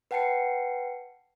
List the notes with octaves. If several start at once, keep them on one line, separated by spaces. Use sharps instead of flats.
B4 F#5 G5 A5 C7 C#7